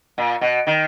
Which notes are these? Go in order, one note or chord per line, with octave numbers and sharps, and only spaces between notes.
A#2
B2
D#3